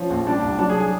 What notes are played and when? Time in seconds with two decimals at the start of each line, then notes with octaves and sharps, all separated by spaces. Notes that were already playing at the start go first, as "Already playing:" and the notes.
Already playing: F3 C#4
0.10 A#1
0.26 G3 D4
0.43 C2
0.59 F#3 D4
0.70 G#4
0.80 G#4